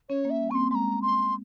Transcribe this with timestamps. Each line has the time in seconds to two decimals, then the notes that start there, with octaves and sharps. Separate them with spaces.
0.09 C#4 C#5
0.25 A#3
0.30 E5
0.40 G3
0.50 C4 C#6
0.55 A#3 C6
0.71 G#3 A#5 C6
1.02 C6